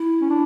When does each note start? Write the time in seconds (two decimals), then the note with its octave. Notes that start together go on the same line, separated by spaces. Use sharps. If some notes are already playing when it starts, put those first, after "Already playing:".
Already playing: E4
0.21 C#4
0.30 D4